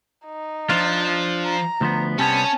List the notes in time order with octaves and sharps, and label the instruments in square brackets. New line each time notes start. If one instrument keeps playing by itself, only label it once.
[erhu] D#4
[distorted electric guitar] F3 [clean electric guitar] D4 F4
[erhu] A#5
[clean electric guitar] D2 F3 B3
[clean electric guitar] C3 G3 B3 [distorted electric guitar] C#4 [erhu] A5